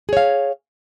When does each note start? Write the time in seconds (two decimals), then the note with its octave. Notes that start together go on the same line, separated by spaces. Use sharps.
0.09 G#4
0.13 C#5
0.17 F5